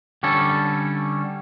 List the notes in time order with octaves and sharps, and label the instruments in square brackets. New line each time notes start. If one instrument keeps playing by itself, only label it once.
[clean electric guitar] D3 G3 C#4 A4